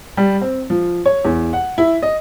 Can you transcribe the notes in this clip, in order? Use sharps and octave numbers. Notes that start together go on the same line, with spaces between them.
G3
C4
F3
C#5
E2
F#5
E4
D#5